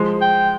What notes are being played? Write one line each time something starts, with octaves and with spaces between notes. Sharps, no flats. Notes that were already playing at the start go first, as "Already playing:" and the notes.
Already playing: F3 G#3
G5